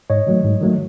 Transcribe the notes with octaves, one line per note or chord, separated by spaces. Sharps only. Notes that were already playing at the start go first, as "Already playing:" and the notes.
G#2 C#5 D#5
D#3 F#3 A3
G#2
D#3 F#3 A3